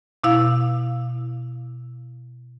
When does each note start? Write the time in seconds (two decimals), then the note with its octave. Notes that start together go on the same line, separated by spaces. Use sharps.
0.24 B2 E4 F5